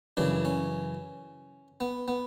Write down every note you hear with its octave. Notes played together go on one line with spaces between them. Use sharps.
F#2 C#3 E3 D4
C#4
B3
B3